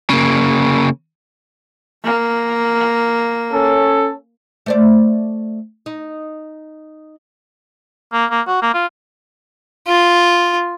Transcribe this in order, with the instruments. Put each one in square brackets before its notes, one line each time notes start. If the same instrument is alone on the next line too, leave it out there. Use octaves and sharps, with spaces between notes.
[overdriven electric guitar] C#3 A#3
[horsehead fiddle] A#3
[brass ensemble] C#4 A4
[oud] A3 C5 D5
D#4
[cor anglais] A#3
A#3
F#4
A#3
F4
[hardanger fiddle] F4